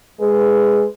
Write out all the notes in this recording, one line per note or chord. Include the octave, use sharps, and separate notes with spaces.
G#3 B4